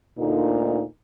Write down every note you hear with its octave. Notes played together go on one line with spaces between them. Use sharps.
D2 A#2 D#4